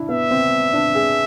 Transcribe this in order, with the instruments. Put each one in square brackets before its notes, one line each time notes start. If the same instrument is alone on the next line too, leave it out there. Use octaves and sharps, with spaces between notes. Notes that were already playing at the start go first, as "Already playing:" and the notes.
Already playing: [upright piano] D4 E4
[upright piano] B3 [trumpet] E5
[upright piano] C4
D4
G#4